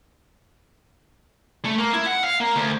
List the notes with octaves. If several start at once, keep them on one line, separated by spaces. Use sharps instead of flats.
A3
A#3
E4
F#5
F5
A#3
D2